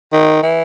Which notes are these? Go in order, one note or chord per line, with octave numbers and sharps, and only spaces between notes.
D#3
E3